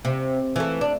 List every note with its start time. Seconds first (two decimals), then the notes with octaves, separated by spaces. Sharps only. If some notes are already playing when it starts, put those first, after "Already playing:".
0.05 C3
0.56 E3 A3
0.81 D4